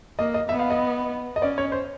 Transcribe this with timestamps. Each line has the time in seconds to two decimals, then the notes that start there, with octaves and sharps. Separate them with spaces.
0.19 A#3 D#5
0.34 D#5
0.49 B3 E5
0.59 F5
0.70 D#5
1.36 D#5
1.42 C#4 D5
1.58 C#5
1.72 C5